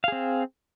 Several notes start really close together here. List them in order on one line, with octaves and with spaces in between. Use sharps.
F5 G#4 C4